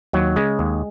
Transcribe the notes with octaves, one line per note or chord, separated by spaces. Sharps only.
D#2 F#3
C#3 G#3
D#2